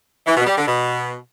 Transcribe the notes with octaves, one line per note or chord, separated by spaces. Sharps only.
E3
B2
G3
D3
B2